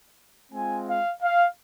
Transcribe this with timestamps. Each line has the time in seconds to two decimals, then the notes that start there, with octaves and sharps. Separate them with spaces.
0.52 G#3 C4 F4 G#5
0.87 F5
1.22 F5